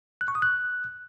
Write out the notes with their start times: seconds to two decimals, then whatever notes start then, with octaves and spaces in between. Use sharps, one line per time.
0.21 F#6
0.28 C#6
0.35 D#6
0.42 F#6